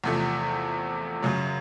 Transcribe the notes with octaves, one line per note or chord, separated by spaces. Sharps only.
E2 C3 F3 A3
F#2 C#3 F#3